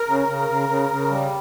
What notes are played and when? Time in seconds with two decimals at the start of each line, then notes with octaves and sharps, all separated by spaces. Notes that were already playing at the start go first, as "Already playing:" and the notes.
Already playing: A#4
0.08 C#3
0.28 C#3
0.49 C#3
0.69 C#3
0.90 C#3
1.11 G3